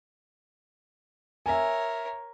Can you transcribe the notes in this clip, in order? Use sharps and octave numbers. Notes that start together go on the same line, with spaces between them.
A#4 C#5 E5 G#5